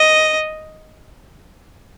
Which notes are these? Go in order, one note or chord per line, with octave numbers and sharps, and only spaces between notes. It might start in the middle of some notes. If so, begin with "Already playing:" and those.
Already playing: D#5